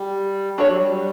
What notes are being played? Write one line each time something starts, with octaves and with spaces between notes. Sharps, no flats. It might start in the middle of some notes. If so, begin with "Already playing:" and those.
Already playing: G3
G3 D4 F#4 A4 C#5
F#3
G3